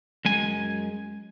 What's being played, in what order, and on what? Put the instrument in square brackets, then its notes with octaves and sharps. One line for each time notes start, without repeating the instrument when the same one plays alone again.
[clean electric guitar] F#2 G#3 G#5